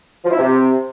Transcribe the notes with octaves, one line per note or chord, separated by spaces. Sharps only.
F3
E4
C3